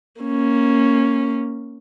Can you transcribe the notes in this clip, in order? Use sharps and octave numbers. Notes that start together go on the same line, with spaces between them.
A#3 C#4